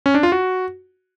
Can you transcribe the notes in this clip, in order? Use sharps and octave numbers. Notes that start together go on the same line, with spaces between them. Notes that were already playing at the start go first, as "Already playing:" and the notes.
C#4
D4
F4
F#4